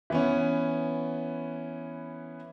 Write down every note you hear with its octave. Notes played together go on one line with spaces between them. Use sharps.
E3 B3 C#4